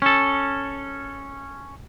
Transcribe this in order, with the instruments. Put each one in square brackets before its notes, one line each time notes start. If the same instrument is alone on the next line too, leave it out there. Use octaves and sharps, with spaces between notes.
[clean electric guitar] C#4 A4